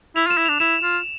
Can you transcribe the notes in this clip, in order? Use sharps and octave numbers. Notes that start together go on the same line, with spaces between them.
E4 F7
F4
E7
E4
D4 F7
E4 E7
F4